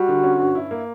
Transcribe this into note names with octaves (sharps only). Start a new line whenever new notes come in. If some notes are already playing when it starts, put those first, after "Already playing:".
Already playing: G3 F#4
D3
C#4
G2
E4
A#3